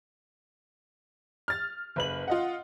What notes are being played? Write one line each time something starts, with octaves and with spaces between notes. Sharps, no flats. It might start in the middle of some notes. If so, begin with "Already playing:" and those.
F6 A6
F#1 B4 F#7
F4 D#5 F#5